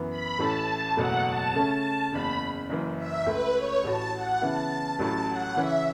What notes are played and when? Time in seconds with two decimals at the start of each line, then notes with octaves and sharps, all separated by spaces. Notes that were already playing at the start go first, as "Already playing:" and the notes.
Already playing: F#2 E3 B3
0.10 B5
0.39 A1 A2 E3 C#4 A4 A5
0.96 F#1 E2 B2 F#3 A3 F#5
1.25 A5
1.54 C#3 A3 C#4
2.12 F#1 E2 C#3 B5
2.69 F#1 F#2 E3
2.98 E5
3.26 C#2 C#3 A3 B4
3.55 C#5
3.84 A1 A2 A3 F#4 A5
4.13 F#5
4.41 C#3 E3 B3 E4 A5
4.99 A1 A2 F#3 C#4 A5
5.28 F#5
5.57 C#3 E3 C#4 E5